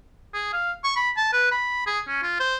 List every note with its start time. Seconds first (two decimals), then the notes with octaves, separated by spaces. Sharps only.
0.34 G#4
0.53 F5
0.84 C#6
0.96 B5
1.17 A5
1.33 B4
1.51 B5
1.86 G#4
2.08 C#4
2.23 F4
2.40 C5